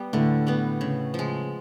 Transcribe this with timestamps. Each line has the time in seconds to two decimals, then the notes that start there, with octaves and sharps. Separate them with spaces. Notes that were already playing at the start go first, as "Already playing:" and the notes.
Already playing: G3 B3
0.13 A2 D3 A3
0.47 G3 B3
0.81 C#3
1.14 F3 G#3